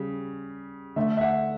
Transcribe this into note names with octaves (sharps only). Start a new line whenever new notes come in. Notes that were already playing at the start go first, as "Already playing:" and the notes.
Already playing: C#3 G3
D3 A3 E5
E5
F#5